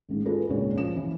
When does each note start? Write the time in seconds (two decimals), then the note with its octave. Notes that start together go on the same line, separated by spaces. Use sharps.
0.09 A1 G#2
0.26 F4 F#4 G#4 A4 B4
0.49 C#2 A#2 G#3 D4 C#5
0.73 F#2 F3 E7
0.96 E3